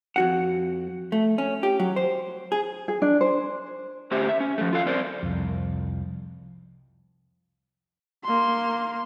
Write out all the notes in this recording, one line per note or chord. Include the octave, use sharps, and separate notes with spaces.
F2 F#4 F#5
A3
C#4
G4
F#3
C5
G#4
G#4
D4
C5
A3 C#4 G4 C5 E5
E5
C#4
F3 A3
F4 A4 F5
C4 A#4 C5 D5
C2 F2
A#3 C6